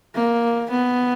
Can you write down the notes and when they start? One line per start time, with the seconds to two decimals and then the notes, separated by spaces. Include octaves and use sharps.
0.15 A#3
0.70 B3